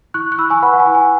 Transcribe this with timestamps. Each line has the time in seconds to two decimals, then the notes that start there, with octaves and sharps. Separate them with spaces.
0.14 E4 C#6 F#6
0.32 F#6
0.38 E4 B5 E6
0.50 G#5 C#6
0.62 B4 F#5 B5
0.73 F#5
0.79 G#5
0.87 E4
0.95 G#5